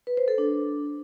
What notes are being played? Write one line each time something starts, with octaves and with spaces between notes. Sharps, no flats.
B4
C5
A4
D4